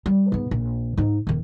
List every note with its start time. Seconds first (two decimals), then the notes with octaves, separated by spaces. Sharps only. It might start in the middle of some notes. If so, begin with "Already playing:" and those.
0.06 G3
0.32 G#2 B3
0.51 A#1
0.97 G#2 D#4
1.27 D#1 D#3